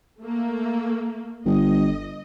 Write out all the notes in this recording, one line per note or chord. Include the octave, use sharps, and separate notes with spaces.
A3 A#3
G1 D#5